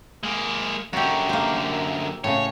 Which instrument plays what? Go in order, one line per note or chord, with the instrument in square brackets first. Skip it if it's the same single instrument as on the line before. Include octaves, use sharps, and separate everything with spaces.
[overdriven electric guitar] G#3 A#3
[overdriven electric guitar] F#2 D3 [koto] F#4 G4
[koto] A#3 C5
[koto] A2 C#3 [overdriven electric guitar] C#5